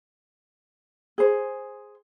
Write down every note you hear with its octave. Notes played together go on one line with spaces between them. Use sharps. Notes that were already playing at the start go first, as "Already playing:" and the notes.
G#4 C5